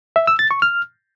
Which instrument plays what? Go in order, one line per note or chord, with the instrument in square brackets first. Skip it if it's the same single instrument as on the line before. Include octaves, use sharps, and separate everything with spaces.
[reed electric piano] E5
E6
A6
C#6
F6